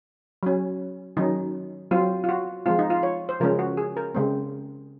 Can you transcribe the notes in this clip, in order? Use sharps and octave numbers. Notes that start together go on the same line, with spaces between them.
F#3 C#4
D#3 F#3 C#4 D#4
F#3 C4 F4
F4
F#4
F3 G#3 C4 F4
D#4
F4
C#5
C5
C#3 F3 G#3 C#4 A#4
F#4
G#4
A#4
C#3 G#3 C4